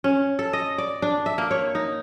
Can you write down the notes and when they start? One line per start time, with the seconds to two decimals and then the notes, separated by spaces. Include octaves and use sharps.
0.04 C#4
0.39 A4
0.53 D#5
0.78 D5
1.02 D4
1.26 E5
1.38 A#3
1.51 C#5
1.75 D#4